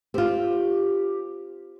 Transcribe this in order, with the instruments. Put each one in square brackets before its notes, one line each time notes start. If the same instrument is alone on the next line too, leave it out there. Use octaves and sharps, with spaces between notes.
[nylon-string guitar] C4 F4 [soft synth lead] G4